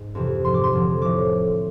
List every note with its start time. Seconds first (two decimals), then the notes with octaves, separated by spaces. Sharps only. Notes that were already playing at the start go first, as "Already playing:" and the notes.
Already playing: G#2
0.15 F2 C3 E3
0.44 G#2 F3 C6
0.54 D6
0.64 C6
0.73 F2 D3 F3
1.01 A2 F3 D6